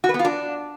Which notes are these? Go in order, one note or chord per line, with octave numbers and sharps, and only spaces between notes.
F#4
B4
B3
F4
D4